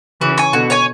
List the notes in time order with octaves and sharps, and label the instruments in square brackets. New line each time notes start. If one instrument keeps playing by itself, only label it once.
[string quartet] C#3 E3 [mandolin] F#4
[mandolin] C#5 G#5
[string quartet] B2 D3 [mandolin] F#4
[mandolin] C#5 G#5